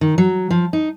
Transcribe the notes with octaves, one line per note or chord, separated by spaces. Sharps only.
D#3
F#3
F3
D#4